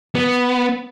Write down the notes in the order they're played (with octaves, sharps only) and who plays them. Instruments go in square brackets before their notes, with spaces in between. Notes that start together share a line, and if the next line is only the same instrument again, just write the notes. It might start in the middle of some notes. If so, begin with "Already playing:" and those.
[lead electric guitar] B3